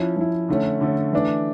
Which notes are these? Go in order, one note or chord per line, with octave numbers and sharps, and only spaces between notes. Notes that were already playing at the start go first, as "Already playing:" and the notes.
Already playing: F3 C#4 E4
F3 C#4 E4
D3 A3 C#4
D3 A3 C#4
E3 A3 D4